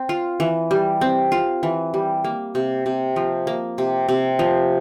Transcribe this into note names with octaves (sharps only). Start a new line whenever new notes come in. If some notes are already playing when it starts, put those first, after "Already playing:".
Already playing: C4
F4
E3
G3
C4
F4
E3
G3
A#3
C3
C3
F3
A#3
C3
C3
F3